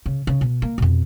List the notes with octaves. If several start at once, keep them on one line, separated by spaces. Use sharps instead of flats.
C#3
C#3
B2
A#3
F2 B2